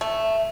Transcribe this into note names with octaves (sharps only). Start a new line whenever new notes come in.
A3